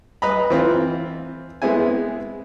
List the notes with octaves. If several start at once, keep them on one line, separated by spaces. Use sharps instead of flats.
B4 D#5 A#5 B5
E3 C4 F4
G#3 B3 C4 E4 G#5